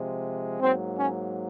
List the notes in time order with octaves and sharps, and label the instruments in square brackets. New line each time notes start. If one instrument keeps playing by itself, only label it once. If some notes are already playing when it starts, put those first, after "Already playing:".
Already playing: [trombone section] C3 F3 G#3
G#2 F#3 A#3 C4
C#4